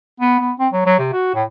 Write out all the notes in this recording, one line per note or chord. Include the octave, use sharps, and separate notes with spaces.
B3
B3
C4
F#3
F#3
C3
F#4
A2